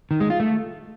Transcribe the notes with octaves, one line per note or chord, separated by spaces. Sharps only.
D#3
G#3
F4
A3